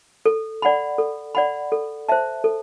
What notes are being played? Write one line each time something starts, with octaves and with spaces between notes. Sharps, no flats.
A4
D5 F#5 B5
A4
D5 F#5 B5
A4
C5 E5 A5
A4